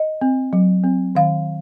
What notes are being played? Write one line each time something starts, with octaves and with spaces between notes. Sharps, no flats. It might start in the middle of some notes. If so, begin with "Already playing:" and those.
Already playing: D#5
C4
F#3
C4
D#3 F5